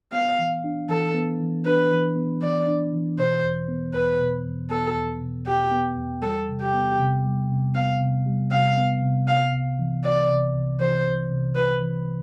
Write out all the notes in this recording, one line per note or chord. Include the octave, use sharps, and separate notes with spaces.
B3 F5
E3
D4
E3 A4
B3
E3
D4 B4
E3
B3
E3 D5
D4
E3
B2 C5
E2
B3
E2 B4
B2
E2
B3 A4
E2
B2
E2 G4
B3
E2
G3 A4
C3
G4
B3
C3
G3
C3
B3 F5
C3
G3
C3 F5
B3
C3
C3 F5
C2
E3
C2 D5
C3
C2
E3 C5
C2
C3
C2 B4
E3